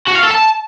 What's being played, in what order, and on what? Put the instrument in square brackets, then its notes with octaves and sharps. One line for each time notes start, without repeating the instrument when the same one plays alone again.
[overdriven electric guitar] F#4
F5
A4
A5